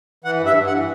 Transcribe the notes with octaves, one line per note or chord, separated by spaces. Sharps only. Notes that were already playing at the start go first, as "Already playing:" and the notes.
E3 F#5
G2
E5
G2
F#5
E3